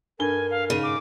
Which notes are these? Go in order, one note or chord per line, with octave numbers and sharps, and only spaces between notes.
G2 A4 A#4 G#5 G7
F5
G#2 C#3 D#7
D6